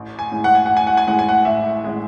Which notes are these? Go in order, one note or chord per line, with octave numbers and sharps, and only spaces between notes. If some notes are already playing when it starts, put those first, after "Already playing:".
Already playing: A1
G#5
A2 G#3
F#5
G#5
A1 F#5
G#5
F#5
G#5
A2 G#3 F#5
G#5
F#5
A1 E5
A2 G#3